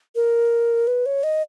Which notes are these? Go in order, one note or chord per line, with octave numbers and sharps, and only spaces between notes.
A#4
B4
C#5
D#5